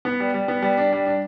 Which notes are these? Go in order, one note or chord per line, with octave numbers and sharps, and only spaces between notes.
B3
G3
G3
B3
G3
D4
G3
D4